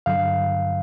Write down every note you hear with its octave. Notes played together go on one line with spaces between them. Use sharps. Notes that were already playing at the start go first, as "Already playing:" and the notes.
G2 D3 F#3 F5